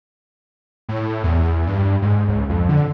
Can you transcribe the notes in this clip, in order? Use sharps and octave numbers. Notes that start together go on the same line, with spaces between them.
A2
E2
G2
G#2
C#2
F2
D3